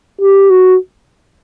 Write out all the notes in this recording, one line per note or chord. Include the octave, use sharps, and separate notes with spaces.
G4
F#4